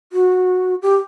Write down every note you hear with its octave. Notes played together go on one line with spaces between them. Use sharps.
F#4
G4